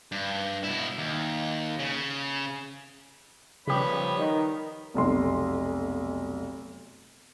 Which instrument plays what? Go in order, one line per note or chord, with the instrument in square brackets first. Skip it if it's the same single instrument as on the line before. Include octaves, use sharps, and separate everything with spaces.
[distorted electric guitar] G2
B2 E4
D#2
C#3
[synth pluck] C#3 G4 [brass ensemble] F3 G3 [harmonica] B3 C#5 B5
[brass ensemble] D#3
[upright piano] F1 B1 C6